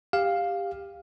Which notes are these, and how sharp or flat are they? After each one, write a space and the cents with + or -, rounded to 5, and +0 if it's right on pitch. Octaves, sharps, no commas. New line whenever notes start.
G4 +20 F5 +5